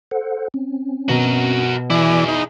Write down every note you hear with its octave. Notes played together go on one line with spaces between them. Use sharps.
A4 C5 F#5
C4 C#4
B2 F#4 A#4
E3 E4 G#4 D5
D#4 B5